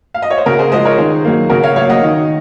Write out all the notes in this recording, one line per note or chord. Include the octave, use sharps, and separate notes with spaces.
F5
D#5
C#5
C5
C#3 F#4 A#4
G#4 C5
F3 G#3 C5 D#5
A#4 C#5
D#3 G#4 C5
F#3 A#3
C#3 F#4 A#4
C#5 F5
F#3 A#3 C#5 F5
D#5 F#5
D#3